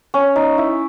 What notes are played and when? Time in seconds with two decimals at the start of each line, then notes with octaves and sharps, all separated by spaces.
0.14 C#4
0.36 D#4
0.58 E4